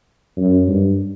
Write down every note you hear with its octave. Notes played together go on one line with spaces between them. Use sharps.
F#2
G2